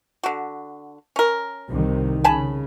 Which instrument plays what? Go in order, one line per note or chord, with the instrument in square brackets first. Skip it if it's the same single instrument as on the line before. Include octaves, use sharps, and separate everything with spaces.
[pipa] D3 F#4
C#4 A#4
[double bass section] C2 C3 D#3
[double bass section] C#3 [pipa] G#5 A5 B5